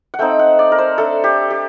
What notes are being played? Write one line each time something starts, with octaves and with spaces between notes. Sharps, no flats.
F#5
A3 C4 D#4 G5
F#5
D5
A#4
C5
A3 D4 A4
G4
G4